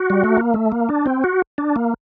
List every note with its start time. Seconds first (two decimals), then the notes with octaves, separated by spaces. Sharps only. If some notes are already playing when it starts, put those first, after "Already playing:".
Already playing: F#4
0.10 G3
0.24 A3
0.37 A#3
0.54 A3
0.72 A#3
0.89 D4
1.06 C4
1.24 F#4
1.58 D4
1.76 A#3